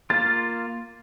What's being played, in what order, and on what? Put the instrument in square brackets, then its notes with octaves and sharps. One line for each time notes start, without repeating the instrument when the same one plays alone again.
[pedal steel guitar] A#3 F4 [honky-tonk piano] A6